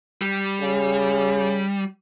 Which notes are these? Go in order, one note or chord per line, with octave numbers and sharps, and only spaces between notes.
G3
C#3